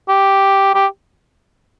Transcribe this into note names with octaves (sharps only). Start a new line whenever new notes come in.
G4
G4